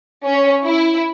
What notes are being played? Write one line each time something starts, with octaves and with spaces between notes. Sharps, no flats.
C#4
E4